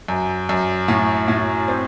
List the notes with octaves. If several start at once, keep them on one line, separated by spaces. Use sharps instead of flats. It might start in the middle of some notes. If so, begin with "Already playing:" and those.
F#2
F#2
A2
A2
C4